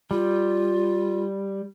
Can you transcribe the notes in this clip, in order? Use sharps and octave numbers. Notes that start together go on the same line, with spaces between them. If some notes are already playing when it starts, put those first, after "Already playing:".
G3 F4